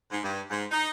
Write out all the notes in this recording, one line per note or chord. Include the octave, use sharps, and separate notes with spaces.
G#2
G2
G#2
D#4